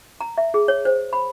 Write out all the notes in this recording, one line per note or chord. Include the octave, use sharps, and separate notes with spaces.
A#5
E5
G#4
C#5
C5
B5